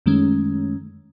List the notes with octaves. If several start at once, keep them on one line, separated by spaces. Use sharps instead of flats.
F#2 D#3 G#3 A3 C#4